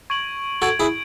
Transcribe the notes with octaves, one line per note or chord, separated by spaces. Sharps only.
C#6 G#6 D7 F#7
F#4 A4 C#6 G#6 D7 F#7
E4 G#4